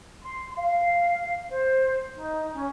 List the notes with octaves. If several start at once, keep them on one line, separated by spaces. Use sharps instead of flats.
C6
F5
C5
D#4
C#4